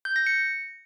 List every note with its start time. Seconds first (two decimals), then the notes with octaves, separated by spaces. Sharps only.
0.05 G6
0.16 A#6
0.27 C#7